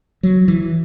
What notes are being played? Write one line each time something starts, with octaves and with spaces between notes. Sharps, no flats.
F#3
E3